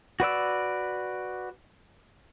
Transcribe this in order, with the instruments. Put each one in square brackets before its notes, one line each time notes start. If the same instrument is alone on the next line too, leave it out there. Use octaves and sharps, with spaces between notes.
[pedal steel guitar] F#4 B4 D5 E6